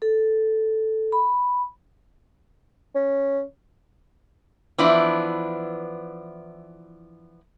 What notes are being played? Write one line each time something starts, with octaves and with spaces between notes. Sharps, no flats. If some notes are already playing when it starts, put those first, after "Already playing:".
A4
B5
C#4
E3 F3 B3 D4 E4